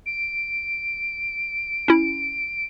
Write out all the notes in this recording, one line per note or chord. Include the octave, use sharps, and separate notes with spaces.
D7
C#4 E4